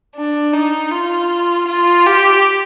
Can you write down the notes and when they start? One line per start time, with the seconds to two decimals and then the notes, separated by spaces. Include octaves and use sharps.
0.15 D4
0.53 D#4
0.91 F4
1.67 F4
2.06 G4